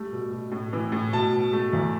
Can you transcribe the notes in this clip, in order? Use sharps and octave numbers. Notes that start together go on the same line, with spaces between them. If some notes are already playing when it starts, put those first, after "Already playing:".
Already playing: G3 A3
B2
B2
A2
E3
A2
B2 A5
B2
A3
E2